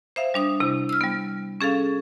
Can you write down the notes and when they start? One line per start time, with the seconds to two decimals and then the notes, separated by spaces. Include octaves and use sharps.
0.16 C5 E5 F5
0.34 G3 D4 D#6
0.60 C3 E4
0.89 E6 F6
1.01 G3 B3
1.61 C#4 G#4 A4 F5